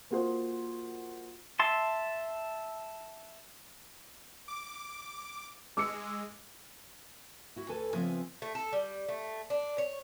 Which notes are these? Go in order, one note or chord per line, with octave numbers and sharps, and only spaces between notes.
A#3 F4 F#4 G#4 C5
E5 A5 C6
D6
G#3 D6 E6 C#7
E4 F#4
D2 A4 B4 G#5 A5
C#3 F3 B3 C4 E5 G#5
A3
A4
G3
A3
D4
C#5